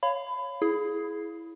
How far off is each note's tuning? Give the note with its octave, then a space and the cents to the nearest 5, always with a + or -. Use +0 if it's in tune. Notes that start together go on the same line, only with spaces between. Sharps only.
C#5 +0 F5 +0 B5 +25
E4 +0 G#4 +15